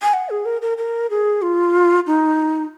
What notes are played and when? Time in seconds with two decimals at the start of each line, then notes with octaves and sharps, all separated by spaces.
0.02 G#5
0.13 F#5
0.30 G#4
0.45 A#4
0.62 A#4
0.78 A#4
1.10 G#4
1.42 F4
2.07 D#4